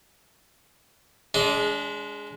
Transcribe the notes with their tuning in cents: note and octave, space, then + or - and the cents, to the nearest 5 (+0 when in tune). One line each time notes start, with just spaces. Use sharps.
G#3 +0 D4 -35